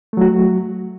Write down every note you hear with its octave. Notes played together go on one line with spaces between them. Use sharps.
F#3 A3 F#4